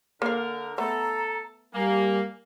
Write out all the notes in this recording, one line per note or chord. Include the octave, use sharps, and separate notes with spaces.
D3 A#3 A#4 F5
A3 B3 A4 A#5
G3 A#3 G#5